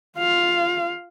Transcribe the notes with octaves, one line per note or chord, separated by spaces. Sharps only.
F4 F5